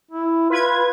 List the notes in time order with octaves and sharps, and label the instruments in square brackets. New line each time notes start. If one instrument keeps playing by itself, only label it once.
[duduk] E4
[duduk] F4 [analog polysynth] B4 G#6